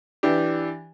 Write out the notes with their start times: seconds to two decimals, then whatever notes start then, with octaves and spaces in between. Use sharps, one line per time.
0.23 E3 D4 G4